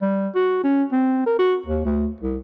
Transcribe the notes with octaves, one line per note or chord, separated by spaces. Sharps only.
G3
F#4
C#4
C4
A#4
F#4
D#2
D2
C2